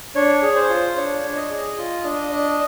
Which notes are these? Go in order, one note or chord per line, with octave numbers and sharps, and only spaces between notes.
D4 C#5
G#4
C5
F4
D4 C#5
D4
D#5
G#4
F4
D4
D4